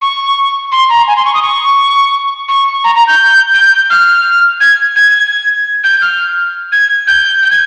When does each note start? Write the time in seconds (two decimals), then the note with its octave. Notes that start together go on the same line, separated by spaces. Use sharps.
0.02 C#6
0.72 C6
0.90 A#5
1.07 G#5
1.16 C6
1.25 C#6
1.34 D#6
1.42 C#6
2.48 C#6
2.84 A#5
2.95 A#5
3.07 G6
3.54 G6
3.90 F6
4.60 G#6
4.96 G#6
5.84 G6
6.01 F6
6.72 G#6
7.07 G6
7.42 G6
7.51 G#6